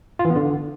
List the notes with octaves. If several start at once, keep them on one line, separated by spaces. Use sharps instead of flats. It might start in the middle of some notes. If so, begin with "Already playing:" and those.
F4
E3
B3
D3